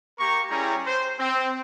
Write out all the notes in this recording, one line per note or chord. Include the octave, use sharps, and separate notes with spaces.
A#3 G4 A#4 A#5 C#6
G3 C#4 E4 G#4 G5 A#5
C5
C4